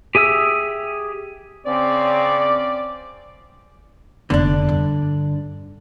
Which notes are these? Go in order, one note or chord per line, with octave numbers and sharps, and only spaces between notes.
G4 G#4 E5 D#6 E6
C#3 C4 D5
F1 D3 B3 D4
G2